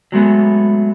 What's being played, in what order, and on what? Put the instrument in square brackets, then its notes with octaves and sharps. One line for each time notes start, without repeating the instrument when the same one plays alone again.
[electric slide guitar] F#3 G#3 A3 B3